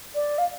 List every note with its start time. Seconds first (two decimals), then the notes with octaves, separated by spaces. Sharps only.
0.15 D5
0.38 F5